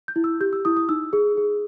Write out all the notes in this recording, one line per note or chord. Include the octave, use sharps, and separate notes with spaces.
G6
E4
E6
G4 G6
E6
E4 D#6
D#6
D#4 E6
G#4
G#4